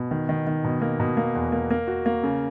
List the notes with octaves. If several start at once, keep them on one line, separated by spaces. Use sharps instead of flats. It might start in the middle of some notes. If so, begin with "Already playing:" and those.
Already playing: B2
D#3
D#3
D#3
B2
A#3
B2
A#3
E2
A#3
A#3
F#4
A#3
C#3